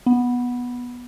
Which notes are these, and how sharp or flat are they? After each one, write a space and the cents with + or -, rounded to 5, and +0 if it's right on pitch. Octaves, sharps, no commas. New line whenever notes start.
B3 -10